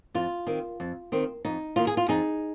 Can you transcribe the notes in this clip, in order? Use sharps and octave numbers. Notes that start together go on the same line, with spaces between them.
F2 F4
D#3 C4
F2
D#3 C4
F2 D#4
D#3 A#3 F4
G#4
F4
F2 D#4 G#4